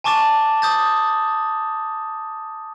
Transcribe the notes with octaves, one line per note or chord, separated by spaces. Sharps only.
G#5 A5 C#6 D6 A6 E7
D#6 G6 A6